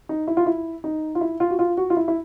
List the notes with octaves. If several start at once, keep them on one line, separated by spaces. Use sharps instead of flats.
D#4
E4
F4
E4
D#4
F4
E4
F4
F#4
F4
F#4
F4
E4
E4